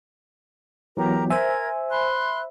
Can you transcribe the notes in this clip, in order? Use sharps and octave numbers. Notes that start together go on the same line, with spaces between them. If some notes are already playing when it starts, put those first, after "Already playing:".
E3 F#3 B3 G4 A#4 A#5
A#4 C5 E5 G#5 G#6
B5 C6 F#6